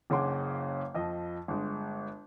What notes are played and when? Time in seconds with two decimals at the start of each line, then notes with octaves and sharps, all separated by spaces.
0.10 F#1 C#3 G#4 F#5 C6 D6
0.95 F2 F3 D#5
1.48 G1 G#3